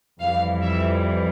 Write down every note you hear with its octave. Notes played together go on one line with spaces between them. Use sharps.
F2 E3 G3 F5
E5